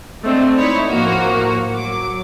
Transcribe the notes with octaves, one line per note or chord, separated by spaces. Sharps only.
G#3 A3 C4 D4
D#4 E4 C#5
A2 F3 A#3 F#4
F#3 D6